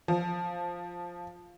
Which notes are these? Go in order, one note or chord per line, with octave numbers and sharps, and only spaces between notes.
F3